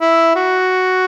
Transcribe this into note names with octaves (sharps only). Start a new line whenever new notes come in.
E4
F#4